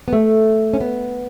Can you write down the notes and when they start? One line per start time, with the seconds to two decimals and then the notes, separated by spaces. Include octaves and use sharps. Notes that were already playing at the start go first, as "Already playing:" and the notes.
0.08 B3
0.13 A3
0.73 C#4
0.81 B3